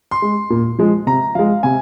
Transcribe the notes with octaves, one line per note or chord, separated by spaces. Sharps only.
C6
G#3
A#2
F3 G#3
C3 A#5
F3 G#3 F5
C3 G#5